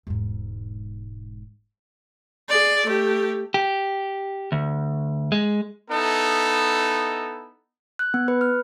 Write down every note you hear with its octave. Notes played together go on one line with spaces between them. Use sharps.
E1 G#2
G#4 D5
A3 G4
G4
D2
G#3
B3 D#4 E4 A4
F#6
B3
B4
F6